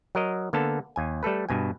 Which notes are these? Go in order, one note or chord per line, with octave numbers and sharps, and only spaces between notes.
F#3 A#4 D#5
D3 A#3 B3 A4 A5
D#2 G#5
G3 A3 A4 B4
G2 B2 G#5